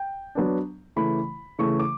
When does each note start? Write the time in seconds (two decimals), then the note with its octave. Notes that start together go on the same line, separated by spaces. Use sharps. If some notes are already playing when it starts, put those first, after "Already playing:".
Already playing: G5
0.35 F#3 B3 D4
0.96 C#3 E3 A3 B5
1.59 C#3 E3 A3 C#6
1.79 D6